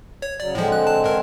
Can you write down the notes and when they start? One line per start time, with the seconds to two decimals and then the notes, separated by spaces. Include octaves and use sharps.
0.22 C#5
0.40 C#3 F#3 D5
0.55 A2 D3 F3 G#3 C4
0.72 F#6
0.87 A5
1.04 G2 A#4